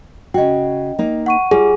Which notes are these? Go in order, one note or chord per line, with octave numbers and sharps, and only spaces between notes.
C#3 F#4 D#5 G5
A#3 D#4
F#5 C#6 D#7
G3 F4 G#4